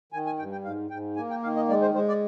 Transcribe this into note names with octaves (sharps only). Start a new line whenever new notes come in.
D#3 G#5
G#5
G2 G5
G5
G#2 F5
G#2 G5
A#3 G#5
G5
D#3 F5
D#5
G#3 D5
C5
G#3 C5
D5